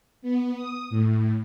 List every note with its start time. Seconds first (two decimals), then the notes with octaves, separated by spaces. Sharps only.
0.22 B3
0.55 D#6
0.90 A2